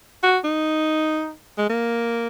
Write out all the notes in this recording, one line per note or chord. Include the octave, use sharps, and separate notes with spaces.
F#4
D#4
G#3
A#3